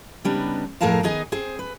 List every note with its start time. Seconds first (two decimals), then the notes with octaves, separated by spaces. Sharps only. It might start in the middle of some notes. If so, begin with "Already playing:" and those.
0.24 C#3 G3 B3 D4 D#4
0.81 F2 A2 G#4 A#4 F5 A5
1.03 D#3 B3 D#4 G#4 D#5 G#5
1.32 C4 G#4 C5
1.59 B4